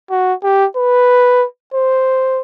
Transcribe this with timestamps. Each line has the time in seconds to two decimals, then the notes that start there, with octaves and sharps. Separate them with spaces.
0.10 F#4
0.43 G4
0.76 B4
1.74 C5